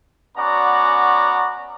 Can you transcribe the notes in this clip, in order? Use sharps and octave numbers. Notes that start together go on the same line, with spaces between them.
B3 C#4 F#4 D5 A#5